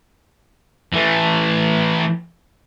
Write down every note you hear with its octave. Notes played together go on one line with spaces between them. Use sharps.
E3 A3